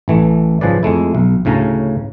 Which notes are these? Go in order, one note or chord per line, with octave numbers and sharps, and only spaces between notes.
A1 E3 A3
G#2 C#3 F3 G#4 B4 D5
F2 G#3 A3 E4
B1
D2 A2 C#3 C#4 A5 A#5